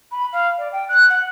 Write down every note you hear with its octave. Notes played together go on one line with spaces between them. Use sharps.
B5
F5
D5
G5
F#6
F#5